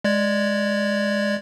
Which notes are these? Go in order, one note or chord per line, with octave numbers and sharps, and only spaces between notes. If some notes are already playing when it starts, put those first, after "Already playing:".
G#3 D5 G#6